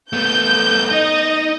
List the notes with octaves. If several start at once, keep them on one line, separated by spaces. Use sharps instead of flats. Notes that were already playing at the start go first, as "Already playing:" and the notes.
A3 B3 G6
D#4 D#5